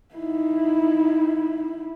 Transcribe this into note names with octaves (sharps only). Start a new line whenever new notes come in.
D#4 E4